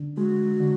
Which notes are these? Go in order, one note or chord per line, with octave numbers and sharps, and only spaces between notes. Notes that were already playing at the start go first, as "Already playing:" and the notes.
Already playing: D3 D4
G#3 F#4
D3